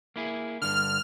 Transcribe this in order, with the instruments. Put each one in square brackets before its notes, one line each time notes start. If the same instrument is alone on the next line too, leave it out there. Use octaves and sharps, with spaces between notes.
[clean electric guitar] A#3 E4 G#4
[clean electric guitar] G2 D3 [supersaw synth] F6